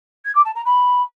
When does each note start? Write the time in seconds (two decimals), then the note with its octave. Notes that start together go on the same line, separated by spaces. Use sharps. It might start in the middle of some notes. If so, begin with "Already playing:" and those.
0.25 G#6
0.35 D6
0.45 A5
0.55 A#5
0.65 B5